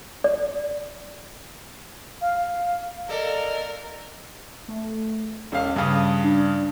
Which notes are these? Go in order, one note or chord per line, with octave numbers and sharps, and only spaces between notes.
D5
F5
A#3 A4 A#4 D5 D#5
A3
E1 C#4 F5
G2 C#3 D#6
D4